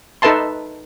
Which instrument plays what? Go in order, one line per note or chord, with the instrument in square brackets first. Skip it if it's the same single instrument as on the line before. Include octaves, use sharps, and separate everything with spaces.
[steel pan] D#4 A4 B4 E5 A5 C6